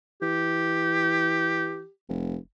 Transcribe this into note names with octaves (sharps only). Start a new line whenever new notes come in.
E3 G4
F1